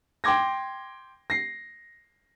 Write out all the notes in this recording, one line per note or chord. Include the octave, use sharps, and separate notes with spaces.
G5 C6 D6 G#6 A#6
A#6 C7